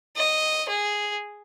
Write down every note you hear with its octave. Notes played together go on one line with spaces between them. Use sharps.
D#5
G#4